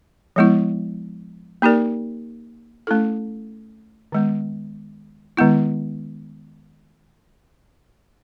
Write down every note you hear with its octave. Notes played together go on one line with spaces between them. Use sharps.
F3 G#3 B3 E4
A#3 D#4 G4 A#4 D5
A3 C#4 E4 A4
D#3 G#3 B3
D#3 G#3 B3 E4